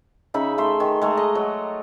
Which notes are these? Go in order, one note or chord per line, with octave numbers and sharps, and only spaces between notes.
C#3 D#4 E5 B5
A3 E5 C6
D#3
G#3 A3 A#5
D#5
F#3